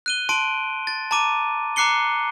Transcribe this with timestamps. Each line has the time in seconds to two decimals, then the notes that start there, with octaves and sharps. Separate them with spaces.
0.06 F#6 D#7 G7
0.29 A5 C6 D7 D#7
0.87 A6
1.11 A5 A#5 D6 D#7
1.76 A#5 D6 F#6 C7 C#7 G7